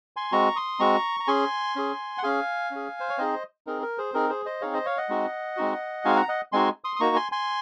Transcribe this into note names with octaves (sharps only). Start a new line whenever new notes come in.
G#5 C6
G#3 C4 F#4 A#5 C#6
C6 D#6
G#3 C4 F#4 A#5 C#6
A#5
C#4 G#4 G#5 C6
C#4 G#4
F#5
C#4 G#4 F5 G#5
C#4 G#4
C5
C#5
C4 D#4 G#4 C5 D#5
C4 D#4 G#4 A#4
A#4
G#4 C5
C4 D#4 G#4 A#4
G#4 C5
C5 D#5
C4 D#4 G#4 C#5 F5
C5 D#5
C#5 F5
D#5 F#5
G#3 C4 D#4 F#4
G#3 C4 D#4 F#4
G#3 C4 D#4 F#4 F5 G#5
F#5 A#5
D#5 F#5
G#3 C4 D#4 F#4 G#5 C6
C6 D#6
D#6
A#3 D#4 F#4 A#5 C#6
G#5 C6
G#5 C6